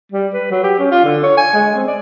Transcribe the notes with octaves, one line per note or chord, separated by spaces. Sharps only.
G3
B4
F#3
G4
C#4
F4
D3
C#5
G#5
G#3
C4
D5